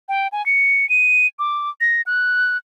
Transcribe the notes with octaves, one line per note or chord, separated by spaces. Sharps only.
G5
G#5
C#7
D#7
D6
A#6
F#6